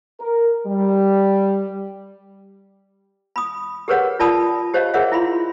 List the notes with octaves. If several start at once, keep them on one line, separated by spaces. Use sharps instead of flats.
A#4
G3
B5 D#6
G4 G#4 A#4 B4 C#5 F#5
F4 A#4 D5 A5 B5 D#6
G4 C5 C#5 D#5 F5
G#4 A#4 C#5 E5 F#5
E4 F4 B5 C6